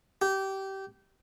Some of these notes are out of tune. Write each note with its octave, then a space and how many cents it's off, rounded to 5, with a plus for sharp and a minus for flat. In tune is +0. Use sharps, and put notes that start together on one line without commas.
G4 -20